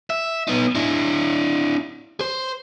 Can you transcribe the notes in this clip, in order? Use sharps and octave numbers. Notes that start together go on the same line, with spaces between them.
E5
B3 D#4
D4 E4
C5